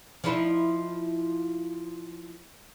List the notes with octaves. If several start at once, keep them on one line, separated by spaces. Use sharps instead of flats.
F3 D#4 E4